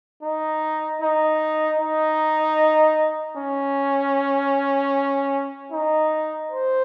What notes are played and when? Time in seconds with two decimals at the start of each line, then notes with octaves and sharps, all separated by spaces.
0.23 D#4
1.02 D#4
1.80 D#4
3.37 C#4
5.72 D#4
6.52 C5